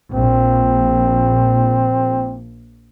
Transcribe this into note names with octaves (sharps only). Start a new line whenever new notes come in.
A#1 C4